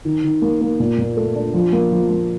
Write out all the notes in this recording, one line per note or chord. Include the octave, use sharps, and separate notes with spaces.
D#3
D#3
A#3
A#3
A#2
A#2
A3
D4
F3
A#3
F3
A#3